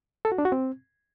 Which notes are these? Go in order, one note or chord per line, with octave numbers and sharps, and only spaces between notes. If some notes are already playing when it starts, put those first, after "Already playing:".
A4
F#4
D4
F#4
C4